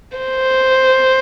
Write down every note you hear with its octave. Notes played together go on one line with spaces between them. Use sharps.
C5